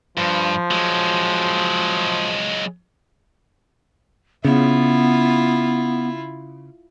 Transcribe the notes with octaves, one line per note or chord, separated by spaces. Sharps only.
G2 F3
F#3 G#3
C#3 B3 E4 F4